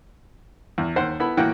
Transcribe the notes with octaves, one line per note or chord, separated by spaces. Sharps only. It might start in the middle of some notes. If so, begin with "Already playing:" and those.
E2
D#2 C5 F#5
B3 E4 A4 B5
A2 E3 A#3 F#4 F#5 G5